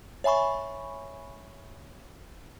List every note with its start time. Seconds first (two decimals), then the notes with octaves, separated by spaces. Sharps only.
0.24 C#5 E5 G#5 B5 C#6